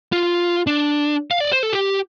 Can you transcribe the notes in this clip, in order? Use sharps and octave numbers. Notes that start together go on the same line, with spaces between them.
F4
D4
F5
D5
C5
A4
G4